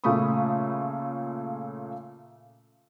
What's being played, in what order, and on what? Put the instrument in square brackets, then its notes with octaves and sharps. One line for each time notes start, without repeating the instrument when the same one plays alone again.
[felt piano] A#2 C#3 A3 B5 C#6 D#6